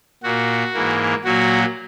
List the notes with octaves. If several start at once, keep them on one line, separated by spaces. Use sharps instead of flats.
A#2 A#3 F#4
G#2 E3 A#3
A#2 F#3 A#3 F#4